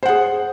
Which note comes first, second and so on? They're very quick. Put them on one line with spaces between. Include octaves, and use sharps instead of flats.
C5 F#5 G#4